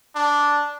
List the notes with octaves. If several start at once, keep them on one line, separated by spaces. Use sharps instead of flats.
D4